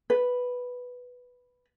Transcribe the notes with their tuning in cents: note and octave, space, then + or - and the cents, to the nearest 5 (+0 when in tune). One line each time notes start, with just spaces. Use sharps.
B4 +0